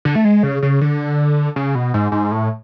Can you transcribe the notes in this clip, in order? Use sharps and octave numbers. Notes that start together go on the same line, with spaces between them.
D3
A3
G#3
C#3
C#3
D3
C#3
B2
G#2
G#2
A2